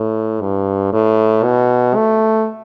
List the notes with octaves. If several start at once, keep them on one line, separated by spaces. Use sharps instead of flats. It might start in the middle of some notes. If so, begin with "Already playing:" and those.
Already playing: A2
G2
A2
B2
A3